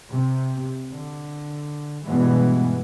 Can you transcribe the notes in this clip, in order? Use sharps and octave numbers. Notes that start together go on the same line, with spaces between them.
C3
D3
G2 B2 E3 G#3 B3